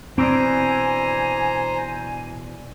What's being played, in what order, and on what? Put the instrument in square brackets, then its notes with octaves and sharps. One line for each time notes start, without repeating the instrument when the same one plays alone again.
[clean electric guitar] B2 E3 D4 [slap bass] C4 [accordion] C5 A#5 [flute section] G#5